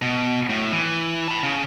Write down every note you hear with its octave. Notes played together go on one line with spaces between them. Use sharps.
B2
A2
E3
A5 B5
C#3